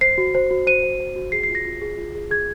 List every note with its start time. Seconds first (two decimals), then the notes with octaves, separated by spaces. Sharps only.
0.01 C5 C7
0.18 F#4
0.35 C5
0.51 F#4
0.67 C5 D#7
0.83 C5
1.00 C5
1.16 F#4
1.32 G#4 C7
1.43 C7
1.49 F4
1.55 A#6
1.65 F4
1.82 G#4
1.98 F4
2.15 G#4
2.31 G#4 G#6